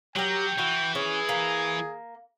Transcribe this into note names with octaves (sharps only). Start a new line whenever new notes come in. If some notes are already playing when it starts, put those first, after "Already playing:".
F#3 G4 A#4 G5
E3 F#4
C#4 G#4
A#3